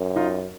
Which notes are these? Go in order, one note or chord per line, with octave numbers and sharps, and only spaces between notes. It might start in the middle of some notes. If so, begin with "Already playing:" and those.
Already playing: F#2
D#4 F4